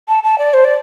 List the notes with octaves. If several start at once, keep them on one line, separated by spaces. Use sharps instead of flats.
A5
A5
D5
C5
D5